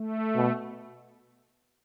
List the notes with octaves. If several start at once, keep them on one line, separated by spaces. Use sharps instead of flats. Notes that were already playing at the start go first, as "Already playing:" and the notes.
Already playing: A3
B2